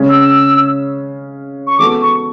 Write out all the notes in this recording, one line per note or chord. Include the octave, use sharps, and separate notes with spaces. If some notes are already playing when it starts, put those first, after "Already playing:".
Already playing: C#3 G#3 C#4
E6
C#6
E3 G#3 B3 F#4 A4 D6
C#6